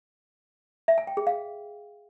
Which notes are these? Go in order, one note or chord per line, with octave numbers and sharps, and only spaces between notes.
E5
G#5
G5
G#4
F5